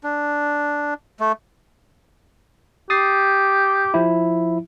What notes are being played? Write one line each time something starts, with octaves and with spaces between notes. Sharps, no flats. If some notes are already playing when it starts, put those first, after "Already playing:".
D4
A3
G4 D#6 A6 C7
F3 E4